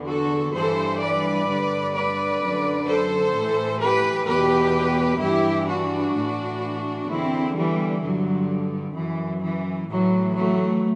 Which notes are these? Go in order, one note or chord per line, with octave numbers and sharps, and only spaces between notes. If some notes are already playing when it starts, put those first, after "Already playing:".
Already playing: E2 D3
F#4 A4
G2 E3 A4 C5
B4 D5
G2 D3
B4 D5
F#2 D3
A4 C5
A2 E3
G4 B4
E2 B2 G4 B4
G2 E3 E4 G4
D4 F#4
A2 E3
E2 D3 C4 E4
E3 G3
G2 D3 F#3
F#2 E3
E3
A2 E3 F#3
F#3 A3